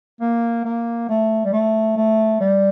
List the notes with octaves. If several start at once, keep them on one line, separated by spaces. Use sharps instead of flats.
A#3
A#3
A3
G3
A3
A3
G3